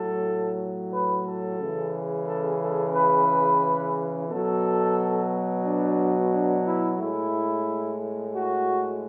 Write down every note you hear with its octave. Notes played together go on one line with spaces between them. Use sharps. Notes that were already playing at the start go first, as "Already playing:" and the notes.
Already playing: A2 F#3 A4
B4
A4
C#3 E3 G#3
A4
A4
B4
B2 F#3 A4
D4
D4
E4
A2 G#3 E4
F#4